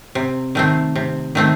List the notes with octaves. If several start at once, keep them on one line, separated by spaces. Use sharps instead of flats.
C3
D#3 A3 C4
C3
D#3 A3 C4